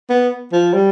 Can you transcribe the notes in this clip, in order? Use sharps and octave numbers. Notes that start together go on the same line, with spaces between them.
B3
F3
G3